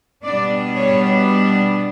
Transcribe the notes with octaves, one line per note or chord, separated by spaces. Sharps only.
B2 G3 B3 D4 D5
C#5